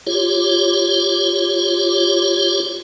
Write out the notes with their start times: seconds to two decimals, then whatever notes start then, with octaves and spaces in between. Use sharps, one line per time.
0.07 F4 G4 C#5